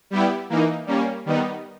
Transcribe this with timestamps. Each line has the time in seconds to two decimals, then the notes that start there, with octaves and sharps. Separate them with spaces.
0.11 G3 B3 E4 G4
0.49 E3 A#3 D#4
0.87 G3 A#3 C#4
1.26 D#3 G3 B3 D#4